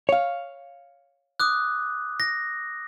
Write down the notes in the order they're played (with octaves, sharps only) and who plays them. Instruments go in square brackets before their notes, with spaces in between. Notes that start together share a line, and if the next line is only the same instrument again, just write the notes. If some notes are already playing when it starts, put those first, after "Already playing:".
[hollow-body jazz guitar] C#5 F5
[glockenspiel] D6 D#6 F#6
A#6